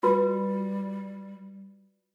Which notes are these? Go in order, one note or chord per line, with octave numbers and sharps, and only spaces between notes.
G3 F4 F#4 B4